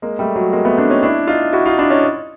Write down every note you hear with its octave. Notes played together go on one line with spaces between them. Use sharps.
G#3 A#3
G3 A3
F#3 G#3
G#3 A#3
A3 B3
C4 D4
C#4 D#4
D4 E4
D#4 F4
E4 F#4
D#4 F4
D4 E4
C#4 D#4